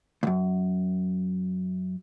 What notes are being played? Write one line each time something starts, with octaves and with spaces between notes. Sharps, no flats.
C#2 F#2